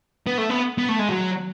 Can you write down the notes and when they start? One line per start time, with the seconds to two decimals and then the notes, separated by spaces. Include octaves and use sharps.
0.27 B3
0.38 A3
0.50 B3
0.78 B3
0.89 A3
0.99 G#3
1.09 F#3